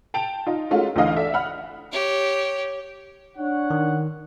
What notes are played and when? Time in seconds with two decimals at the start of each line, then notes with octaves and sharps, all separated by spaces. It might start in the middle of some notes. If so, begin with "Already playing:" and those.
0.14 G5 A5 D7 F7
0.47 D#4 F4
0.71 G#3 A3 C#4 F4 F#4 A#4
0.96 D2 E3 D4 D#5 F5 F6
1.16 A4 D5 E5
1.34 F#5 B5 F6
1.92 G4 C#5
3.37 D4 C#5 F#5
3.70 D#3